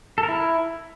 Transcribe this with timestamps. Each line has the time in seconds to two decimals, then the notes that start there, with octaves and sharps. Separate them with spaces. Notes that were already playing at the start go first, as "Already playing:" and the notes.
0.18 A4
0.23 A#4
0.29 E4